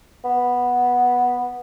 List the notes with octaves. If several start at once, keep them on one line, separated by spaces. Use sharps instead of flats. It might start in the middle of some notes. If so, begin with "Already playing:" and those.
B3